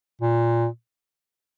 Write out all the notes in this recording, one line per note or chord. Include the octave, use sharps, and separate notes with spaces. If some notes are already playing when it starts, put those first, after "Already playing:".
A#2